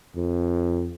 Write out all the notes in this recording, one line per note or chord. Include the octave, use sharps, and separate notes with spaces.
F2